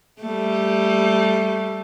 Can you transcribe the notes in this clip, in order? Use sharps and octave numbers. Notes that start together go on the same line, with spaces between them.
G3 A3